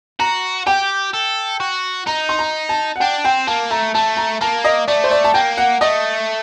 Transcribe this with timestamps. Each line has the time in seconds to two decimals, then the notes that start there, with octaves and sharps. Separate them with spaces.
0.20 F#4 A#5
0.67 G4 G5
1.13 A4
1.60 F#4
2.06 D#4 A#5
2.29 C6
2.39 A#5
2.69 A5
2.96 F#5
3.00 D4 G5
3.25 C4 G5
3.47 A#3 A5
3.70 A3 A#5
3.94 A3 A5
4.17 A#5
4.41 A#3 A5
4.64 D#5
4.88 A3 D5
5.04 C5
5.11 D5
5.24 A5
5.34 A#3 G5
5.58 F#5
5.81 A3 D#5